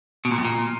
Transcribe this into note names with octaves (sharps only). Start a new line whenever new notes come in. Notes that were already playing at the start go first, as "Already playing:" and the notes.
B2
A#2
F2
A#2